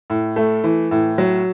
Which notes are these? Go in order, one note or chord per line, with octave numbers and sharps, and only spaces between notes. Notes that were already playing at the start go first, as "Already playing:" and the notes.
A2
A3
E3
A2
F#3